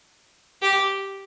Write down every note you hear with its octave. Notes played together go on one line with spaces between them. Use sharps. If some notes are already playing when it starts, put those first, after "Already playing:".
G4